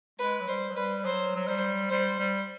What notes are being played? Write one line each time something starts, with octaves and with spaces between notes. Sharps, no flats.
G#3 B4
F#3
G3 C5
F#3
G3 B4
F#3 C5
F#3
G3 C5
G3 C5
G3